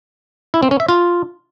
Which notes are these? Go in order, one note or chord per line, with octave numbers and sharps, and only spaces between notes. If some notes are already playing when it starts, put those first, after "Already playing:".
E4
C4
C#4
E5
F4